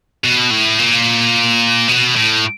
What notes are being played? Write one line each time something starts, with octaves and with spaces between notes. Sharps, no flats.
B2
A2
A#2
B2
A2